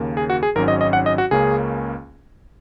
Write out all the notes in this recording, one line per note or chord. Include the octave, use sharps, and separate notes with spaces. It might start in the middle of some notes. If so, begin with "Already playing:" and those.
Already playing: D#2 C#3 A#3
G#4
F#4
G#4
G#1 G#2 F#3 C#4 A#4
D#5
D#5
F#5
D#5
F#4
C#2 C#3 A#3 C#4 G#4